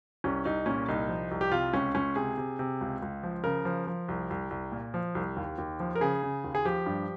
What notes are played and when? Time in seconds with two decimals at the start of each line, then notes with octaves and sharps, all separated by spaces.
0.24 C2 C#4
0.45 C2 D#4
0.66 A#2 C#4
0.88 C2 D#4
1.09 F3
1.31 C2
1.41 G4
1.51 C3 F4
1.74 C#2 C#4
1.95 C#2 C#4
2.16 C3 G#4
2.38 C3
2.59 C3
2.81 C#2
3.02 C#2
3.23 F3
3.44 C#3 A#4
3.65 F3
3.87 F3
4.08 C2
4.30 C2
4.51 C2
4.72 A#2
4.94 F3
5.15 C2
5.36 D#2
5.58 D#2
5.80 F3
5.96 A#4
6.01 C#3 G#4
6.23 C#3
6.44 D#2
6.55 G#4
6.65 F3 G4
6.86 G2